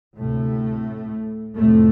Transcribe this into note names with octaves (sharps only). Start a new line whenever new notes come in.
D2 A2 C3 A3
F2 A2 C3 A3